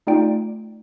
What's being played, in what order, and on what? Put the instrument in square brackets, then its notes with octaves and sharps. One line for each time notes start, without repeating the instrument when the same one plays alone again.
[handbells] A3 D#4 F4 D5 G5 D7